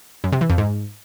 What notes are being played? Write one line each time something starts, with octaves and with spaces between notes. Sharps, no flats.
F#2
C3
E3
F2
G#2